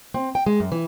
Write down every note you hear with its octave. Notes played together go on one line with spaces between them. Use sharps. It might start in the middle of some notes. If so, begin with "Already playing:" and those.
C4
G5
G#3
F#2
E3